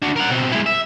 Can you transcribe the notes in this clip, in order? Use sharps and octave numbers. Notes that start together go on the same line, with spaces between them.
D4 F#4
A#4 F#5
B2 C4
G#3 E4
E5